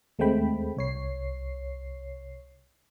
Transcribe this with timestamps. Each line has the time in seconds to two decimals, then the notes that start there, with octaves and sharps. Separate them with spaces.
0.19 D#2 G#3 A3 C4 G5 B5
0.77 C2 C#5 C7